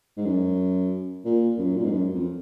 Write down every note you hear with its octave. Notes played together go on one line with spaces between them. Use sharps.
G#2
F#2
A#2
F#2
A#2
G#2
F#2
F2